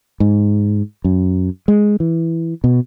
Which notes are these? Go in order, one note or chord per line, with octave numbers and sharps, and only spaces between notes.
G#2
F#2
G#3
E3
B2